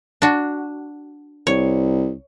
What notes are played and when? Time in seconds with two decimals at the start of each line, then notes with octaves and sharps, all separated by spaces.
0.22 D4 F#4
1.47 C2 C#5